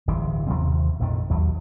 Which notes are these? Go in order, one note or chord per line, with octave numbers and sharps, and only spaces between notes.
D1 G1 C3 E3
D#2 C3 F3 C4
A#1 F2 A2 D#3
D#2 F#3